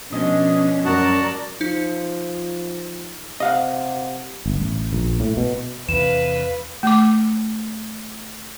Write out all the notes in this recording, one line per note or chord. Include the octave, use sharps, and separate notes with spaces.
B2 F3 C#4 D4 D#5
F#2 F#4 A#4 D5 F#5 A5
F3 D#4
C3 D#5 F5 F#5
G1
A1
A#1
A2
B2
E2 C3 B4 F5 E7
A3 D6